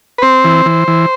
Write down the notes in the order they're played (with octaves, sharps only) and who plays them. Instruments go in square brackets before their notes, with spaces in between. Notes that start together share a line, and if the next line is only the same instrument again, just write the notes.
[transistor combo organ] B4
C4 C5
E3
E3
E3